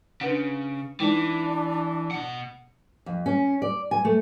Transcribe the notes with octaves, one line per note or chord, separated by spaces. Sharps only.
C#3 D4 B4 F#5
E3 G#3 D4 D#4
B2 F#5
F2
C#4
D5
G#5
A3